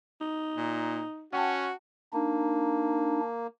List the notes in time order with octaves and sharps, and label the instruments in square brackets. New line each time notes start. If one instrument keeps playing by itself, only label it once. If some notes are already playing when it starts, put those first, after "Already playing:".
[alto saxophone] D#4
[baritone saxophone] A#2
[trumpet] C#4 [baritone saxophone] F#4 [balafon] F#5 G5 A5
[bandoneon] A#3 [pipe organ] D4 D#4